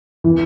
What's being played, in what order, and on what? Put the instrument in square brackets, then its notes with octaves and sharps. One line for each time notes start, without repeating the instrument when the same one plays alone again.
[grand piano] E3